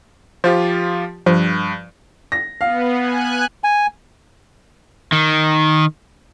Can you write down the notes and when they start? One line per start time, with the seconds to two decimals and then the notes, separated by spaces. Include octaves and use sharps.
0.44 F3 F4 G4 C5
1.26 G2 F3
2.32 A#6
2.61 B3 F5
2.99 G#5 F#6
3.64 G#5
5.12 D#3